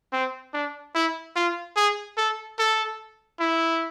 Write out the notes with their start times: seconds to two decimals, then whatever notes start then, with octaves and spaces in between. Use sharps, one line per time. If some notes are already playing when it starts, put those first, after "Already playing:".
0.13 C4
0.54 D4
0.95 E4
1.36 F4
1.77 G#4
2.17 A4
2.59 A4
3.40 E4